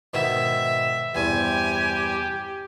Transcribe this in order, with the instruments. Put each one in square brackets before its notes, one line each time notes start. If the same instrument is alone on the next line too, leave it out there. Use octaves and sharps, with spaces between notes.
[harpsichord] G#2 B2 D#3 [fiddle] E5
[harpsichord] E2 G2 C3 [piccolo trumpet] G4 [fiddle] G#5